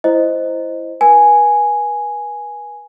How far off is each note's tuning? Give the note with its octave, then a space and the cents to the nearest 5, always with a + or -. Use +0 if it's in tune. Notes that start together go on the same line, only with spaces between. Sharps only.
E4 +15 C5 +0 D#5 +0
B4 -40 G#5 +0